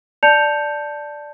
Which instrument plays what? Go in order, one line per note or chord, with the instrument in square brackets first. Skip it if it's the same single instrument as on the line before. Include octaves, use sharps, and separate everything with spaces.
[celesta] D5 A5 G6 C#7 F7